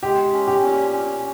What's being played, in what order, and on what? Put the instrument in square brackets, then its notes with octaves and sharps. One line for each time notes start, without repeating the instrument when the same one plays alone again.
[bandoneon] G#3 [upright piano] G4
[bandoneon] C#4
[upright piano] G4
[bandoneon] A#2
C#4